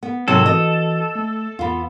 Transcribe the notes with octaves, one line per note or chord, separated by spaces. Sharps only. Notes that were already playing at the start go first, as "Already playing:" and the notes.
B3
G#2 C3 F#3 A#3 A4 G#6
E3 F#4 D#5 A6
A3
E2 B3 F4 B5